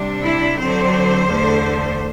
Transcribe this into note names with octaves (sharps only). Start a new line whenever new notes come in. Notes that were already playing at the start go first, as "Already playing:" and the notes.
Already playing: C3 G3 D4
E4
D3 F#3 C4 C5
E2 D3 A3